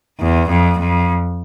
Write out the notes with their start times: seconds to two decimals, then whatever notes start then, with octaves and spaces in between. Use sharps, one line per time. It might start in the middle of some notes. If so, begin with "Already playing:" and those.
0.20 E2
0.49 F2
0.79 F2